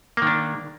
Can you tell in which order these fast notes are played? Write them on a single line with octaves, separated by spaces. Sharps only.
A#3 D#3 D4